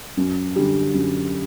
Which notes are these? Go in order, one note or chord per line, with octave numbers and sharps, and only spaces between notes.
F#2
D3 G3
F#2